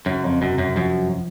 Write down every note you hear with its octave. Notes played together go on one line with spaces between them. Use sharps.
F#2 C#3
F2
F1 F#2
F#2
F#2 F3